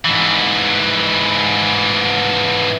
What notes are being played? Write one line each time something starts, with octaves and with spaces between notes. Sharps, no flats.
G#2 E3